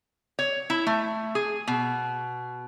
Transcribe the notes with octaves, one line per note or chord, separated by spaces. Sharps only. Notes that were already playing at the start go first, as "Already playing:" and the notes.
C#5
E4
A3
G#4
B2